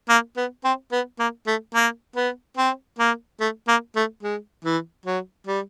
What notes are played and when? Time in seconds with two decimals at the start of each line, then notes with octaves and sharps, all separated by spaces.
0.09 A#3
0.37 B3
0.64 C4
0.92 B3
1.19 A#3
1.47 A3
1.75 A#3
2.16 B3
2.57 C4
2.99 A#3
3.40 A3
3.68 A#3
3.96 A3
4.23 G#3
4.65 E3
5.06 F#3
5.47 G3